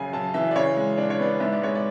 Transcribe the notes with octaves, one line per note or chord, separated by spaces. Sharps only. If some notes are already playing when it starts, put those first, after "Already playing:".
Already playing: F#2 C#3 G#5
F#2 A5
E3 E5
D5
C#3 C#5
G#3
D4 D5
C#5
B3 D5
G#2 E5
D5
G#3 C#5
D5